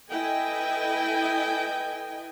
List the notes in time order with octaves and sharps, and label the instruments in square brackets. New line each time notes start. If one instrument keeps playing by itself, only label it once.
[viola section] E4 A4 B4 D#5 G5 G#5